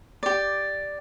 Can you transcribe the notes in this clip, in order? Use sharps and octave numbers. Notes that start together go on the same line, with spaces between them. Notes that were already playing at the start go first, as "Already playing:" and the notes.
G4 D5